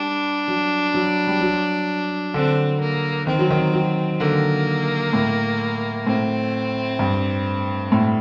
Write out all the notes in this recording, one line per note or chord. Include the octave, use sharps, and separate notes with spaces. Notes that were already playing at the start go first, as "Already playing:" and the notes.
Already playing: G3 D4
F#3
F#3
G3
F#3
D3 C4
A#3
D#3 C4
F#3
D#3
F#3
D3 A#3
A2
A2 C4
G2
A2